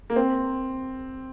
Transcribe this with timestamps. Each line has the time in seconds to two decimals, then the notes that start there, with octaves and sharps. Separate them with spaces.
0.10 A#3
0.16 C4